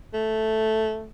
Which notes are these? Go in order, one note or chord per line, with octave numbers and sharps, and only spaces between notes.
A3